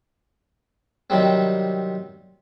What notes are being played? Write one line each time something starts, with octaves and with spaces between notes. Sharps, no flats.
C3 D#3 F#3 G3 C4